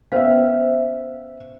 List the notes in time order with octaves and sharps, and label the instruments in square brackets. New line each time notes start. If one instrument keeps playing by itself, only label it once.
[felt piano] B3 E5 [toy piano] C#4 C5 F5